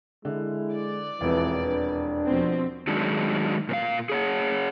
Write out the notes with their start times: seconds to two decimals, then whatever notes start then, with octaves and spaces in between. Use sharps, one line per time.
0.25 D3 G#3 E4
0.73 D5
1.21 E1 F2 E3 B4
1.64 D4
2.25 B2 F3 C4
2.87 D#3 F#3 G#3 D4 D#4
3.69 A#2 C5 F5
4.09 G#4 C#5 F#5